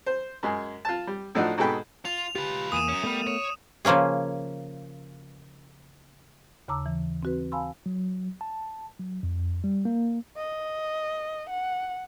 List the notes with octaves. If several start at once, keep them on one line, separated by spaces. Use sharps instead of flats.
C5
F#2 G#3 G#4
F4 A5
G3
A2 F3 A3 D4 D#4 F#4
G#2 B2 G#4 A4 G5 B5
F4 F7
F4 G4 B4
E2 A#3 G#5 D#6 D#7 E7
F#2 C#4
G3 A3 B3 A#4
C#5
C#3 F3 A#3 C#4 G#4
D#2 C#3 A5 A#5 D6 E6
E3
C4 F#4 B4
F5 G#5 A5 B5 C6 E6
F#3
A5
F#3
F2
G3
A#3
D#5
F#5